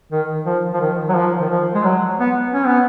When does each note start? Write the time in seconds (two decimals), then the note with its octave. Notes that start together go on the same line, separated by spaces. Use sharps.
0.12 D#3
0.46 F3
0.73 F3
0.81 D#3
1.09 F#3
1.15 F3
1.41 D#3
1.50 F3
1.75 G#3
1.84 F#3
2.20 B3
2.53 C#4
2.66 B3